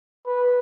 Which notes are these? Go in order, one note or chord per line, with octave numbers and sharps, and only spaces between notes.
B4